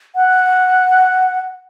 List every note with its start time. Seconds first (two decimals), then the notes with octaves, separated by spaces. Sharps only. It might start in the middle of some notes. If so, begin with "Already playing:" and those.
0.15 F#5